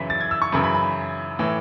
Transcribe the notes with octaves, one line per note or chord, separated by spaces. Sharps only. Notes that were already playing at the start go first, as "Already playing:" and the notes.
Already playing: F#2 C#3 E3 B6
A6
G#6
E6
C#6
F#2 C#3 E3 B5
B5
B5
A2 E3